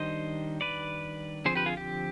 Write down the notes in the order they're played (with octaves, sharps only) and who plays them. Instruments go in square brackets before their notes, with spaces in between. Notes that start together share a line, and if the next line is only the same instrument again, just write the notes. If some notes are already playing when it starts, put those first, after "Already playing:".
Already playing: [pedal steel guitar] D#3 G3 D4 C5 D#5
B4 D5
D3 F3 C4 G#4 C5
G4 B4
F4 G#4
G4